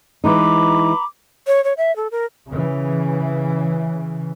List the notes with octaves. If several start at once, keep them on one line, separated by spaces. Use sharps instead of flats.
E3 G#3 D#4 A#5 B5 D6
C#5
C#5
E5
A4
A#4
C#3 E3